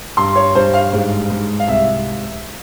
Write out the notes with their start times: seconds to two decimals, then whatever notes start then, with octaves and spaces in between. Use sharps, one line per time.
0.17 G2 C6
0.36 C#5
0.55 G2 C5
0.74 F5
0.93 G#2
1.30 G#2
1.60 F5
1.67 C2 E5